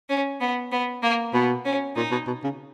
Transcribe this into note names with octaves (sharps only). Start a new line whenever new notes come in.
C#4
B3
B3
A#3
B2 B3
C#4
A#2 D#4
B2
B2
C#3